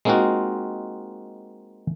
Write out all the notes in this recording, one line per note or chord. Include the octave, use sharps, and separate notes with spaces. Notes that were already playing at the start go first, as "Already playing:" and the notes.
G#3 A#3 C4 D#4 F4 F#4